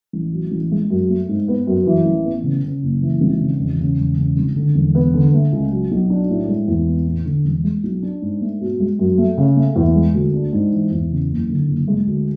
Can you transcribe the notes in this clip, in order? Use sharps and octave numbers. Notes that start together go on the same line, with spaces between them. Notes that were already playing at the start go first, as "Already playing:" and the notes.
A1
F#3
A1
G#3
F#2
A3
G#2
B3
F#2
E3
A1
B3
C#3
C#3
F#1
E3
G#1
C#3
E1
C#3
E1
C#3
G#1
D3
E1
B3
D3
A3
C#2
F#3
B1
D4
A2
G#3
E2
B3
A2
D3
E1
G#3
B1
D4
G#2
A3
B2
G#3
F#2
A3
C#3
A3
E2
G#3
D2
D4
G#2
E3
E2
C#3
F#1
D3
F#1
G#3
D2